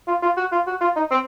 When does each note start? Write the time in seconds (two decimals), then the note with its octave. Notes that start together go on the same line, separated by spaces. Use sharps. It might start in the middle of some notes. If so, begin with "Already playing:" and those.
0.08 F4
0.22 F4
0.37 F#4
0.52 F4
0.67 F#4
0.81 F4
0.96 D#4
1.11 C4